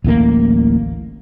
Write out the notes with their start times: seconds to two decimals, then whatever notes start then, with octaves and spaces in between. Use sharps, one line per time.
0.04 D1 A1 A2 A#3